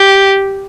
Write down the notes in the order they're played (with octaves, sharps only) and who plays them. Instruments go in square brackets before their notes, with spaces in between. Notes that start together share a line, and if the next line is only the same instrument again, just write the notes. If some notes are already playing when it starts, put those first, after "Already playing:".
Already playing: [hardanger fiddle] G4